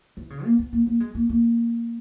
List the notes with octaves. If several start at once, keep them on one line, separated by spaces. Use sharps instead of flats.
E3
C#3
A#3
B3
A#3
A#3
G#3
A#3
A#3